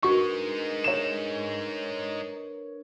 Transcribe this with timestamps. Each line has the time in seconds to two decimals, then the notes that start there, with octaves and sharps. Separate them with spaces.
0.03 G#3 D4 D#4 F#4 A#4 B4 C#6
0.84 C#5 E7